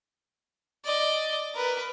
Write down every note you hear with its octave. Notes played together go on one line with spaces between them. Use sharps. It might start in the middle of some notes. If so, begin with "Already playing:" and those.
D5 D#5
A#4 B4